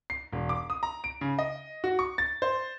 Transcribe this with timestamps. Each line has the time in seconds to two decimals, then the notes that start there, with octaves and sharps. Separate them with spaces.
0.10 C7
0.32 E1
0.49 D6
0.70 D#6
0.83 A#5
1.04 D7
1.21 C#3
1.39 D#5
1.84 F#4
1.99 C#6
2.18 A6
2.42 C5